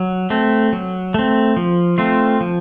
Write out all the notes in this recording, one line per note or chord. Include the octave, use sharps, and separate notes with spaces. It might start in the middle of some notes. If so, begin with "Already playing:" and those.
Already playing: F#3
A3 C4
F#3
A3 C4
F3
A3 C4 F4
F3